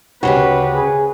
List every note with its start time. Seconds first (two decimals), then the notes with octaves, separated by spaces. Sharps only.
0.23 D2 C#3 C#4 F#4 G4 B4
0.75 G#4